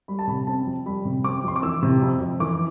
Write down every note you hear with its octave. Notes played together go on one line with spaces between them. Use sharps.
G3 B5
A5
C3 B5
C4 A5
F2
G3 B5
C3
C4 D6
F2 C6
D6
E3 E6
C3
F2
F2
E3 D6